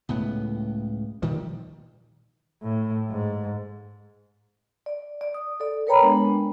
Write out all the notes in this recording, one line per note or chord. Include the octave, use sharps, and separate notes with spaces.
C#2 A2 B3
A#2 D#3 F3 G3
A2
G#2
D5
D5
D#6
A4 D5
A#4 B4 C#5 G5 A#5 B5
G#3 B3 D4